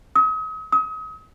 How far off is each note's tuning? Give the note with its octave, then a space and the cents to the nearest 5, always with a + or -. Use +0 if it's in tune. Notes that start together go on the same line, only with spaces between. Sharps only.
D#6 +40
D#6 +35